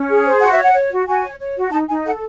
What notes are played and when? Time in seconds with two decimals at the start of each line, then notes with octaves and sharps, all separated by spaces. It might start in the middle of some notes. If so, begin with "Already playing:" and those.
Already playing: C#4
0.10 G#4
0.25 C5
0.41 F#4 F#5
0.52 E5
0.58 C#5 F#5
0.74 C#5
0.91 F#4
1.07 F#4 G#5
1.23 C#5
1.39 C#5
1.56 F#4
1.71 D#4 A5
1.88 D#4 G#5
2.04 A4 F#5